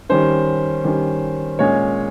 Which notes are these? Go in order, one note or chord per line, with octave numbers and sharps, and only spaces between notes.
D#3 G3 C#4 C5
D#3 G3 C#4
A#2 G#3 C#4 C#5